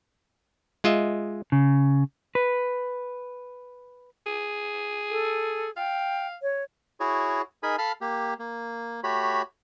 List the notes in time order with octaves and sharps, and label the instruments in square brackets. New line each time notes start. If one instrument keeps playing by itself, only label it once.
[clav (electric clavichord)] G#3 F4 D#5 E5
[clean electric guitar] C#3
B4
[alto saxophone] G#4
[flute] A4
[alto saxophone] F5 [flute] G5
[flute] C#5
[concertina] E4 F#4 G#4 C#5
D#4 G#4 A#4 G#5 B5
A4 F5 A5 B5 F6
A#3 G4
A#3
A3 F#4 G4 C#5 B5